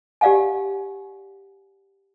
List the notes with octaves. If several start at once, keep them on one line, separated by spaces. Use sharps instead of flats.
G4 D5 F5 F#5 G#5